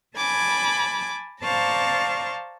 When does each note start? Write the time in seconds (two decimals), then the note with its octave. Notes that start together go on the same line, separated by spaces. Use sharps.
0.17 G#5 A5 B5 D6 G#6
1.43 C5 D5 F5 A5 A#5 C#6